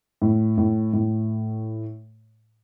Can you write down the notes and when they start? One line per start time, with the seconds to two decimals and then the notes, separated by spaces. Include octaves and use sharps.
0.22 A2
0.58 A2
0.93 A2